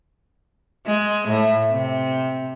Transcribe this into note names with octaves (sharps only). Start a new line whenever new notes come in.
G#3
A2
C3